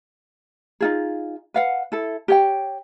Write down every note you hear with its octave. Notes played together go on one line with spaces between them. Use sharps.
D#4 F4 G#4
B4 F5 F#5
E4 A4
G4 C#5 G5